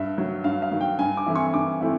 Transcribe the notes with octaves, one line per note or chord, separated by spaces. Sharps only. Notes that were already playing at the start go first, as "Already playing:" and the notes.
Already playing: G2 E5
D#3 F#3
G2 F5
F5
D#3 F#3
G5
G2 G#5
D6
E3 A3 C4 E4
C#6
G2 D6
E3 A3 C4 E4